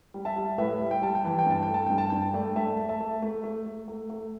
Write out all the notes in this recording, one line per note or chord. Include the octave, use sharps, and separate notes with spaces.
G3
E5 A5
G3
A2 B4 E5
G3
G5
G3 A5
G5
E3 A5
G5
G2 A5
G5
A3
A5
G2 G5
A5
G2 G5
A5
A3 D5 G5
A3 E5 A5
A3
E5 A5
A3
A3
A3
A3
A3
A3